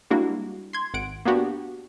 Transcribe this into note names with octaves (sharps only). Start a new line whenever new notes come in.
G3 G#3 A#3 D4 E4 F#4
C6 G#6
G#1 F#5 D7
A#3 B3 D4 F#4 G4